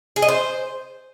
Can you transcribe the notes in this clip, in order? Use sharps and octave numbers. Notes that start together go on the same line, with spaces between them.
G#4
D#5
C5